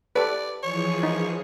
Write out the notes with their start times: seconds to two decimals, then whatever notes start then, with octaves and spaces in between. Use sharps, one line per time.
0.16 G4 A4 B4 D5
0.63 E3 F3 G#4 C#5
1.03 D#4